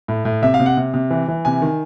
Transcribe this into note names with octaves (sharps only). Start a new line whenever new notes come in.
A2
A2
C3 E5
F5
C3
F#5
C3
C3
E3
E3
C3 G#5
D#3